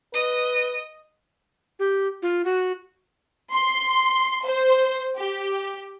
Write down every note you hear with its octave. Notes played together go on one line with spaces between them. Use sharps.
B4 D#5
G4
F4
F#4
C6
C5
G4